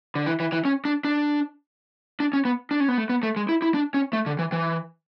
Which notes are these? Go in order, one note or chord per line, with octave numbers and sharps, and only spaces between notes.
D3
E3
E3
E3
C#4
D4
D4
D4
C#4
B3
D4
C#4
B3
A3
B3
A3
G#3
E4
E4
D4
C#4
A3
D3
E3
E3